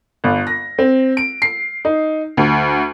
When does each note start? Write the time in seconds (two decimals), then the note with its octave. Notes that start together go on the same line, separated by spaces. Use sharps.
0.24 G1
0.47 A#6
0.79 C4
1.17 D7
1.42 C7
1.85 D#4
2.37 D2